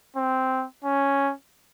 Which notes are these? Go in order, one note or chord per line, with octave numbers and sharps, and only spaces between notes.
C4
C#4